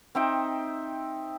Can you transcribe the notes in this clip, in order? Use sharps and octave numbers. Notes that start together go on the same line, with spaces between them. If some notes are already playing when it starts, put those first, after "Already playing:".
C4 D#4 E5 G5